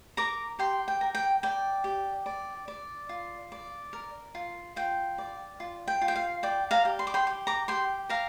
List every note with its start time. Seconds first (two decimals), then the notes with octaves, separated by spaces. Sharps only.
0.17 A#4 A#5 D6
0.59 G4 G5 C6
0.88 G5
1.01 A#4
1.15 G5
1.43 D5 G5
1.84 G4
2.26 D5
2.68 D5
3.09 F4
3.52 D5
3.93 A#4
4.35 F4
4.76 F4 G5
5.18 D5
5.60 F4
5.88 G5
6.01 F4
6.08 G5
6.16 F5
6.43 D5 G5
6.71 F5 A#5
6.85 G4
6.99 C6
7.07 D6
7.14 G5 C6
7.27 G4
7.47 A#5 D6
7.68 G4 G5 C6
8.09 A#4 F5 A#5